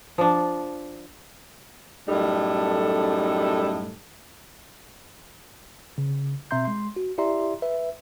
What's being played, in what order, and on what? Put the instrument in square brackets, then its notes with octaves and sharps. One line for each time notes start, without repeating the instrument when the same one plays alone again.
[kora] F3 D4
[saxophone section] F#2 A2 G3 D#4 A4
[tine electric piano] C#3
B2 C4 E5 A#5 C6 G6
G#3 C6
F#4
E4 G4 D5 E5 A#5 C6
B4 E5